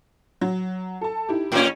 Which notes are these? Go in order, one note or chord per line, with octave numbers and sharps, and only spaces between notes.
F#3
A4 A5
D#4 E4 G4
A2 C#4